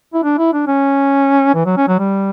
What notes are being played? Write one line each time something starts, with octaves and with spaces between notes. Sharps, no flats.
E4
D4
E4
D4
C#4
E3
F#3
C#4
F#3
G3